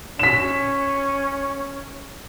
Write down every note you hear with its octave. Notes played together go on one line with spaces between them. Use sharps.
C#4 B6 E7